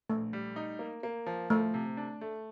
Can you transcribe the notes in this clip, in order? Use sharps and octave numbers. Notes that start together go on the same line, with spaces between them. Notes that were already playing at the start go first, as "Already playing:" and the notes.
A#1 A3
G3
D#4
A#3
A#3
F3
F3 A3
C3
D4
A3